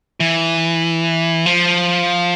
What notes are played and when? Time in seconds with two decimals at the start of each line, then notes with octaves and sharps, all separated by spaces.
0.20 E3
1.46 F3